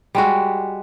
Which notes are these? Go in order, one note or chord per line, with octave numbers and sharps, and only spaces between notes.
G3 G#3 F#4